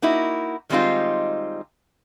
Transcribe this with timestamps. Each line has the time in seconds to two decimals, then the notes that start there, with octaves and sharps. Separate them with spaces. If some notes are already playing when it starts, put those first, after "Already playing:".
0.02 A#3 D#4 E4 F#4
0.70 D#3 G3 G#3 C4 D#4 F4